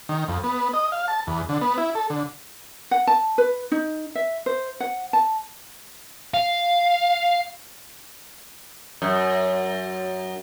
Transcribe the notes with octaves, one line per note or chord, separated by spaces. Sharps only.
D#3
F2
B3
D#5
F5
A5
E2
D3
B3
E4
A4
D3
F#5
A5
B4
D#4
E5
C5
F#5
A5
F5
F#2